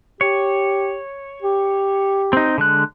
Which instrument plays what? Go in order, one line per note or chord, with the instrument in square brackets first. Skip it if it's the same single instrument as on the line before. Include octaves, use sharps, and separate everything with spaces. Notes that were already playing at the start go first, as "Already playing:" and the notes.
[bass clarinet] G4 [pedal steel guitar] C#5
[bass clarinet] G4
[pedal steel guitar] C4 D#4
D3 G#3 F#6